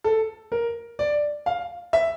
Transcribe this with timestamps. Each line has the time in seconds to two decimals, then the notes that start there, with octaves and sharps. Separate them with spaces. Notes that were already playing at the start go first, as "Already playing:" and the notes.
0.04 A4
0.52 A#4
0.99 D5
1.46 F5
1.93 E5